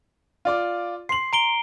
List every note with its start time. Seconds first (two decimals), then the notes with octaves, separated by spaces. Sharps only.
0.45 F4 D5 D6
1.09 C6 C7 F#7
1.33 A#5 D7 G7